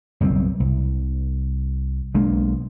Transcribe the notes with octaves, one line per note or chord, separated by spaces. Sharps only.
F#1 B1 G3 C4
C2
B1 G#3 A#3 D4